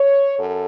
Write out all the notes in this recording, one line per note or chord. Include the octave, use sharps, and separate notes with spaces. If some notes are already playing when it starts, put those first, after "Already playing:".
Already playing: C#5
F#2 A4